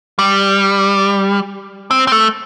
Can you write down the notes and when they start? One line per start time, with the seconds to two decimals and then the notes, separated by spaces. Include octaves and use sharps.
0.19 G3
1.91 C4
2.07 C4
2.12 A3